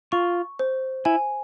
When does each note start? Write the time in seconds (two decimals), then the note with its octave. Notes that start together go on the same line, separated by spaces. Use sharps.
0.12 F4 C#6
0.59 C5
1.05 E4 G#5